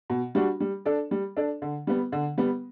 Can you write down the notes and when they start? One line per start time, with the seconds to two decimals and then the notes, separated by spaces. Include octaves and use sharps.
0.10 B2
0.35 G3 D4 F#4
0.60 G3
0.86 D4 A4 D5
1.11 G3
1.37 D4 A4 D5
1.62 D3
1.87 G3 B3
2.12 D3
2.38 G3 B3